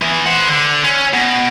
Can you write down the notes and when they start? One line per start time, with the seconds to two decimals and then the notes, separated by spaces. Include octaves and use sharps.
0.02 E3 B3
0.26 C5 F#5
0.48 D3
0.84 C#4
1.14 B2